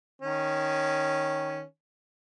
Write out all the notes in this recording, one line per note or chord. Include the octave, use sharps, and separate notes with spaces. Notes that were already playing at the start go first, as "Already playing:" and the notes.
D#3 C#4